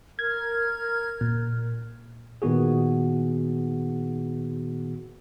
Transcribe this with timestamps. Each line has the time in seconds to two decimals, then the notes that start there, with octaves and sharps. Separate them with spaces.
0.19 A#4 F6 G#6
1.21 A#2
2.42 A#2 D#3 B3 F#4 G#4